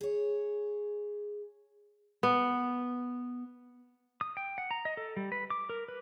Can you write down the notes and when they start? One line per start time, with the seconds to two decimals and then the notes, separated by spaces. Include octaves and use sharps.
0.01 G#4 C#5
2.23 B3
4.21 D#6
4.37 G5
4.58 F#5
4.71 A#5
4.85 D#5
4.97 A4
5.17 G3
5.32 B4
5.50 D6
5.69 A#4
5.88 B4